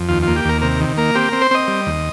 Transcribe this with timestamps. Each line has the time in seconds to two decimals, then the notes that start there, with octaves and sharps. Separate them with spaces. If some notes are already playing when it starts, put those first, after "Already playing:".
Already playing: F2
0.09 D#2 F4
0.23 A#3 F4
0.36 G4
0.45 D#2 A#4
0.62 C3 A#4
0.80 D#3
0.97 A#3 A#4
1.15 C4 G4
1.28 C4 A#4
1.42 C5
1.51 C4 D#5
1.68 G3
1.87 D#2